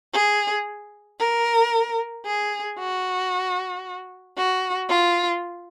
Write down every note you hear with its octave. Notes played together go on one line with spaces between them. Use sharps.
G#4
A#4
G#4
F#4
F#4
F4